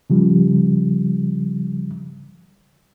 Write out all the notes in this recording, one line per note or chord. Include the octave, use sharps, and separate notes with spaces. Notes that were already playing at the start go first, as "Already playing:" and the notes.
C#3 F3 G3